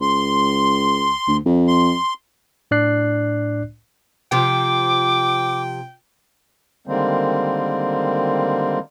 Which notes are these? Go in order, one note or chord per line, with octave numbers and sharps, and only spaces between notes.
C#2 C6
D2
F2
C6
A2 D4 D5 F#6 C7
C3 F3 G5 D6
D3 D#3 G3 G#3 A#3 C4